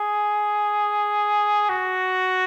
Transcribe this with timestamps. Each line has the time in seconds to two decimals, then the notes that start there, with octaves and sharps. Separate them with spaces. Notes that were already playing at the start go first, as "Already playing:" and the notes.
Already playing: G#4
1.69 F#4